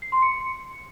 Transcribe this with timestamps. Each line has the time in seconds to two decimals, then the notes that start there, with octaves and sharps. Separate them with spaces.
0.02 C7
0.12 C6
0.22 C#7